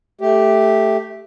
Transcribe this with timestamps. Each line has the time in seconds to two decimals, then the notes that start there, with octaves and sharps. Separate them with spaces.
0.21 A3 G4